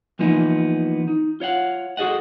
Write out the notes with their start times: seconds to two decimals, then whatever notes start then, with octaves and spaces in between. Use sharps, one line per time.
0.19 E3 F3 A#3 B3 D#4
1.08 D#4
1.40 F4 C#5 F5 F#5
1.97 F#4 G#4 A4 D#5 F#5